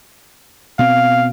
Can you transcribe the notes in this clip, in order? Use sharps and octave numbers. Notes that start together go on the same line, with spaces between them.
B2 C4 F5